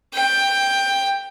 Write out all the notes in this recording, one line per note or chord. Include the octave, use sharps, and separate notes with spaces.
G5